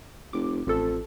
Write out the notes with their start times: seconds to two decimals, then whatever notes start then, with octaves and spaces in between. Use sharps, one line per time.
0.33 F1 D6
0.67 A1 F2 A4